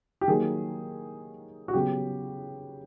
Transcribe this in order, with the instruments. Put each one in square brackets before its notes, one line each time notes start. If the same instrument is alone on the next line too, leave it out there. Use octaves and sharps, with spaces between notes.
[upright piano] G4
D#3 F#3 A#3 G#4
F#4
C#3 F#3 B3 G4